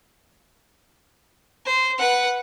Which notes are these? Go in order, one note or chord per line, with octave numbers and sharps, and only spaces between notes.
C5
B4 F#5